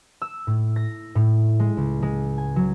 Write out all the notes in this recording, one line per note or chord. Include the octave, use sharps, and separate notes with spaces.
E6
A2
A#6
A2
G#3
C#2
G#3
G#5
F#3